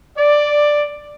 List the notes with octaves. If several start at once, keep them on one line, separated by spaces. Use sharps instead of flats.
D5